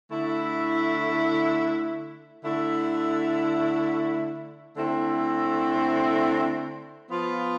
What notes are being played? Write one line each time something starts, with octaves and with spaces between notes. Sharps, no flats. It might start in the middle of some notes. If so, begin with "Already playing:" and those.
D3 A3 E4
D3 A3 E4
D3 A3 C4 E4
F3 B3 F4